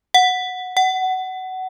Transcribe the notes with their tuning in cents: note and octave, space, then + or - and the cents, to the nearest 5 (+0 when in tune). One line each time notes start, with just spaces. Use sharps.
F#5 -10
F#5 +20